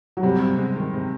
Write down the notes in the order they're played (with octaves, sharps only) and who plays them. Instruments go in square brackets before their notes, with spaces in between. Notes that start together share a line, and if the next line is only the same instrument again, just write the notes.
[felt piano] F#3
[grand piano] C3 [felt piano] G3
[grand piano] C3
G#3
D#3
C3